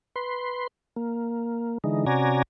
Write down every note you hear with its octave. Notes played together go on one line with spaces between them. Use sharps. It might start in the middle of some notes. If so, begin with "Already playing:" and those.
B4 C6
A#3
D3 E3 G#3 D#4
C3 C#4 F#4 D5 G#5 A#5